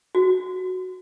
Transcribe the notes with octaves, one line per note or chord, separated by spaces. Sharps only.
F#4